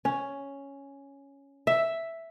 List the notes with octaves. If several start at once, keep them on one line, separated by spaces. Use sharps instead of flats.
C#4
E5